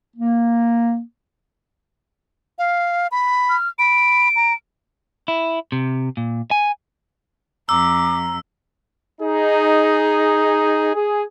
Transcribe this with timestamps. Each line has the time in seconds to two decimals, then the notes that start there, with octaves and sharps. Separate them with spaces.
0.16 A#3
2.59 F5
3.12 B5
3.49 F6
3.79 B5 D7
4.36 A#5
5.28 E4
5.72 C3
6.17 A#2
6.51 G#5
7.69 F2 A#5 D6 E6
9.21 D#4 G#4
10.94 G#4